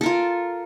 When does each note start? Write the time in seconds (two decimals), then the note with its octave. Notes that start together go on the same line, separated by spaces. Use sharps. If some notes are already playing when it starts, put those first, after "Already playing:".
0.01 A4
0.03 A#4
0.06 F4